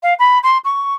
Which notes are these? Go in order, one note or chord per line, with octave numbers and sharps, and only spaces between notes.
F5
B5
C6
C#6